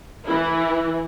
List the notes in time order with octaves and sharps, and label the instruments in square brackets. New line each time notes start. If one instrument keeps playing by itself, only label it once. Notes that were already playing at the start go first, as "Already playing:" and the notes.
[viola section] E3 E4